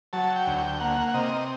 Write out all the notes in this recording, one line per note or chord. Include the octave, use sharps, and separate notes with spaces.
F#3 A5
G5
D2
G5
A#3 F#5
F#5
C3 D#5